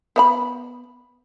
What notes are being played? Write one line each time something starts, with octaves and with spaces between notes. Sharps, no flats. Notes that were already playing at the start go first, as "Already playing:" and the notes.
B3 E5 B5